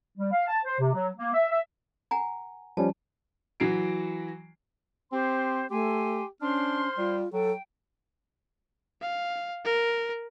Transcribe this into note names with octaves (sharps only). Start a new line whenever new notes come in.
G3
F5
A5
C5
C3
F#3
A#3
E5
E5
F#5 G#5 A#5
F3 G3 C#4 A5
E3 F#3 F#4 C7 D7
C4 G4 C5 C6
A3 G4 G#5 C6
C#4 D4 C5 C6 F6
G3 F4
F#3 A4 G5
F5
A#4